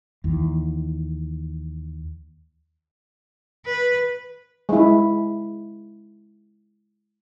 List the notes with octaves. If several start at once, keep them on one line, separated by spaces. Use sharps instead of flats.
D#2 E3
B4
G#3 E4